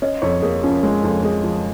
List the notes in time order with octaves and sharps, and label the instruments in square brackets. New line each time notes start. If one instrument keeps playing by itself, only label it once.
[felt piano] C#4 [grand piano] D#5
[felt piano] F2 [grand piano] C#5
[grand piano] A#3 [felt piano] G#4
[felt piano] F3 [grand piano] C#4
[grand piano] G#3 [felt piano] C#4
[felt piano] F2
[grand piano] G#3 [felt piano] G#4
[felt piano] F3